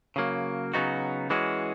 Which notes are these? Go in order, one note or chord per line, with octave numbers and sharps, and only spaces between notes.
C#3 F#3 A#3
C#3 F#3 B3 D#4 F#4
E3 G#3 C#4 F#4